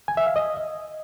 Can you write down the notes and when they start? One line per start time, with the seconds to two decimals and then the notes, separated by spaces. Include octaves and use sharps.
0.08 G#5
0.17 E5
0.27 F5
0.36 D#5